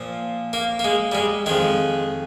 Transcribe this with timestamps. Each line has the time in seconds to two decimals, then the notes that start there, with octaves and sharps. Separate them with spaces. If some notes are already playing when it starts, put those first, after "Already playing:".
Already playing: A#2 F3
0.53 A#3
0.79 A#3
0.84 G#3
1.12 G3
1.15 G#3
1.46 F2 D#3 G#3